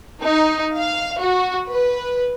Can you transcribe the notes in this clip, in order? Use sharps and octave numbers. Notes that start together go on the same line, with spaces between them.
D#4
F5
F#4
B4